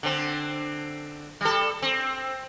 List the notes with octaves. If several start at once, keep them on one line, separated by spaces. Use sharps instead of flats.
D3 C4
G3 A4
C4